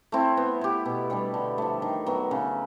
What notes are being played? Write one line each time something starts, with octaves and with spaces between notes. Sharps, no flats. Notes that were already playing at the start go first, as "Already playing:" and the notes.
A3 C4 E4
B3
E4 G4
B2
G3 B3 D4
D3
F3 A3
D#3
F#3 B3
C#3